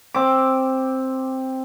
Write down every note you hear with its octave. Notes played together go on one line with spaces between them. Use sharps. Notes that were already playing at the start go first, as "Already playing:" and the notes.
C4 D6